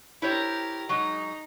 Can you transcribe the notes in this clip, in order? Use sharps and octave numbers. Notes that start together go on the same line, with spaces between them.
E4 G4 A#4 C5 C#5
F#3 G#3 D#4